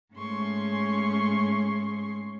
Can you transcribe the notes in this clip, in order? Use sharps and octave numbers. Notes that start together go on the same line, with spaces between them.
G#2 A3 C#4 G#4 C6 C#6